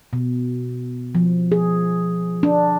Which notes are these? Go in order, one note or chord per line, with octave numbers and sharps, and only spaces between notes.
B2
F3
G#4
D4